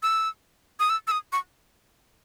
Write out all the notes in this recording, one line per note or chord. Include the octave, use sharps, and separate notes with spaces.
E6
D#6
E6
E6
D#6
C#6